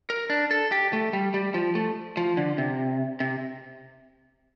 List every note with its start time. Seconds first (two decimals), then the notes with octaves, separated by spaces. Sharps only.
0.10 A#4
0.30 D4
0.51 A4
0.72 G4
0.93 A3
1.13 G3
1.34 G3
1.54 F3
1.75 A3
2.17 F3
2.37 D3
2.58 C3
3.20 C3